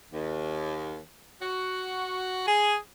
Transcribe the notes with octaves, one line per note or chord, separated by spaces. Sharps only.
D#2
F#4
G#4